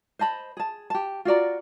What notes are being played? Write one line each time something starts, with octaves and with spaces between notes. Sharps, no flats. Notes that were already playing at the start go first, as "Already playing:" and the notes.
C5 D#5 A5 B5
G#4 A5
G4 A5
F4 F#4 D5 A#5